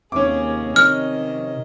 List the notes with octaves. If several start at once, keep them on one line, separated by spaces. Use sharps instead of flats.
D#2 C3 C#4 G#4 D6
D#3 D#5 F6